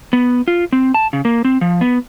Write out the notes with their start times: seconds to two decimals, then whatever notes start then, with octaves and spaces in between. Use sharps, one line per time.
0.13 B3
0.48 F4
0.73 C4
0.94 A5
1.13 C#3
1.25 A#3
1.45 C4
1.61 F3
1.81 B3